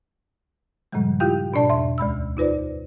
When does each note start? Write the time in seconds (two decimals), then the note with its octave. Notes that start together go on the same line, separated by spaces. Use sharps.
0.93 G2 A#2 C#3 F3 G3 G#3
1.20 E4 F4 G4 F5 G5 G6
1.53 G#2 B2 D4 D5 A5
1.69 E2 E5 C6
1.98 D2 G#3 B5 E6
2.37 D#4 F4 B4 C5 D5